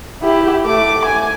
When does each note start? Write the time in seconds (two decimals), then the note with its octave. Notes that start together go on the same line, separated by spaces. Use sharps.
0.23 E4 G4
0.65 A3 D6
1.05 G#5